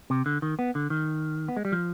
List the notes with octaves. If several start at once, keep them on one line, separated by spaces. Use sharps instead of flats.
C3
D3
D#3
B3
D3
D#3
B3
G#3
G3
F3